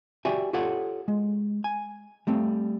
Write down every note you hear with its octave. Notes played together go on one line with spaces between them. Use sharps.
F#4 G4 D5 E5 G5 G#5
F4 G4 A4 C#5 F#5
G#3
G#5
G3 A3 C4